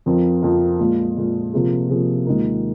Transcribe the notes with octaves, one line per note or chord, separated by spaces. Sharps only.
F2 F3 C4 F4 A#4
F2 F3 C4 F4 A#4
A#2 G#3 F4
A#2 G#3 F4
C3 F3 A#3 F4 G#4
C3 F3 A#3 F4 G#4
D#2 D#3 G#3 F4 A#4